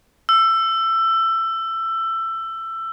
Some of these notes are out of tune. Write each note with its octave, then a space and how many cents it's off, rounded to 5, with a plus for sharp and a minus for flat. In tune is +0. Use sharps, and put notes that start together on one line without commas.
E6 +20